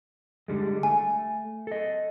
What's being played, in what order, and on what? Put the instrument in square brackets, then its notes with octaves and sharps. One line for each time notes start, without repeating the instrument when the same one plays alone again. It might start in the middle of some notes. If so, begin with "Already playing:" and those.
[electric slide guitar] D3 G3 G#3
[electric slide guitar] A3 [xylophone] G#5
[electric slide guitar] A4 D#5